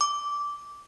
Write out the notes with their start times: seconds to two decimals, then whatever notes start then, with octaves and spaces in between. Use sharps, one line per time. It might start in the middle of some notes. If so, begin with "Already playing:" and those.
0.01 D6